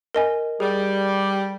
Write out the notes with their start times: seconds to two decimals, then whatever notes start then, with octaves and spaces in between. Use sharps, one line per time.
0.15 A#4 D#5 G#5
0.60 G3 G#4